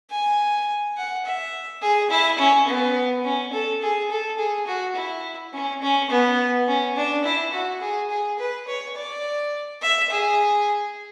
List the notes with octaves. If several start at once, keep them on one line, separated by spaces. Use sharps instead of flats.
G#5
F#5
E5
G#4
E4
C#4
B3
C#4
A4
G#4
A4
G#4
F#4
E4
C#4
C#4
B3
C#4
D4
E4
F#4
G#4
G#4
B4
C#5
D5
E5
G#4